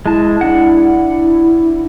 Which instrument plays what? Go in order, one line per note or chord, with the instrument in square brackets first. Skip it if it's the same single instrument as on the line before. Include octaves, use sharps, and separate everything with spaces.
[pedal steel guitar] G#3 A5 [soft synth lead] E4
[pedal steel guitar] D4 F#5